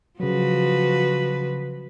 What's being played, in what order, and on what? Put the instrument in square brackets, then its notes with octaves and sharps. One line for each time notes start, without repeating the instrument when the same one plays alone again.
[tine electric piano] C#3 F#3 [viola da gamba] F3 F#4 B4